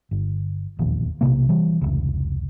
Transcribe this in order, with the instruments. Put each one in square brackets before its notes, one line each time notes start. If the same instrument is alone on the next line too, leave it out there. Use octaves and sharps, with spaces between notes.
[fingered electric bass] G1
E1 A#1 D#2
B1 E2 C3 A#3
E3 G3
F1 C#2